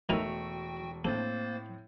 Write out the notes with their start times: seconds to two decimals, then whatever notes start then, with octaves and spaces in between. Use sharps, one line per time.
0.09 E1 E3 A3 D#4 F#4 A#4 G5 E6
1.05 A2 A#3 C4 A4 C5 A6